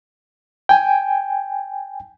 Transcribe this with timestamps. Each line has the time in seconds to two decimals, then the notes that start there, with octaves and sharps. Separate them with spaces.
0.69 G5 G#5